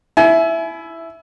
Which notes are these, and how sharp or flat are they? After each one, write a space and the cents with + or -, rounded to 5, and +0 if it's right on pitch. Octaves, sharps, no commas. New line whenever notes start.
E4 +5 G#5 +35